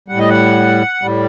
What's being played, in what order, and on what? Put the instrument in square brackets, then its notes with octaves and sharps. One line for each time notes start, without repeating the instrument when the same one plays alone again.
[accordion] A2 G3 F#5
D#5
F#5
A2 G3